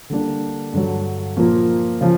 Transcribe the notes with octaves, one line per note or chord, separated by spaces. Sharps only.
D3 G3 A#3 D4
G2 D3 F#3
A#2 F3 A#3
C#3 F3